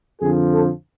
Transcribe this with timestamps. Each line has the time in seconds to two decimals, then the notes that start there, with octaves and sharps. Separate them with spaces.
0.21 F2 D3 F3 G#4
0.51 A4